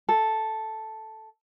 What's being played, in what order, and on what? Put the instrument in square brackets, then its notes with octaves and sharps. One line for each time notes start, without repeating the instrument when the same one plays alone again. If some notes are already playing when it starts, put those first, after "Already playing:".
[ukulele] A4